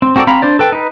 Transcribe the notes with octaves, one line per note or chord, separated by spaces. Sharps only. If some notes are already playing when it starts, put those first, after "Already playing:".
C4
C4 F#4 A4 A#4 D5
C4 F5 A#5 B5
D4 C5 D5
A4 B4 G5
D#4 B4